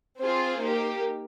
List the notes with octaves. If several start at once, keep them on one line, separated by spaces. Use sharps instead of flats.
C4 F4 G#4 C5
A#3 D#4 G4